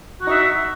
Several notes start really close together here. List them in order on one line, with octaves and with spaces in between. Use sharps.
F#4 D#4 E5